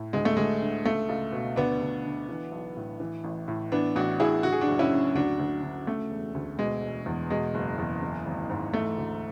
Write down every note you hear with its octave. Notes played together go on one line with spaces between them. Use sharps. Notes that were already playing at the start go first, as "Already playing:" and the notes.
Already playing: A2
D2 G#3
A3
D2 G#3
D3
C#2 A3
C#2
B2
D2 B3 D4
D2
D3
E3
B1
A2
E3
A1
A2
E3 B3 D4
A1 D4 F#4
A2 E4 G#4
D3 F#4
G#4
D4 F#4
F#1
C#4 E4
F#2
D2 D4 F#4
D2
D3
C#3 A3
E1
D2
B2 G#3
E1
E2
B2 G#3
F#1
E2
E3
G#1
G#2
E3 A3
D2